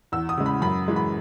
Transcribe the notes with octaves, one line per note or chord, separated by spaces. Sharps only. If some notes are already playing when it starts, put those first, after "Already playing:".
E2 E6
D#6
C#3 G#3
B5
F#2 B5
E3 G#3
B5